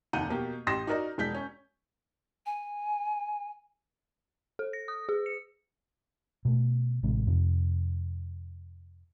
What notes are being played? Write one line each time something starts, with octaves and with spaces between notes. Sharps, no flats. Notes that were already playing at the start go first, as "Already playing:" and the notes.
F1 D#2 F#5 A#5 G6 D#7
B2 A#3 G4
A1 G4 C6 D#6 A#6 E7
D#4 F#4 A#4 D5 D#5
E1 G#3 G6 B6
C#4
G#5
A4
A#6
D#6
G#4
C#7
B2 A3
A1 C3 G#3
F2 C3